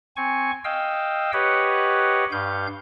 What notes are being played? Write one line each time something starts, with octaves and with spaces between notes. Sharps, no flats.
C4 G#5 C#6
D#5 F5 G5 E6
G4 B4 C#5 D#5 F#5
G2 F5 G6